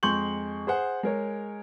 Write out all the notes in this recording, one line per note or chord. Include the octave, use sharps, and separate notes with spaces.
F2 G#3 C6 C#6 G6 F#7
G#4 C5 F#5
G#3 A#4 C#5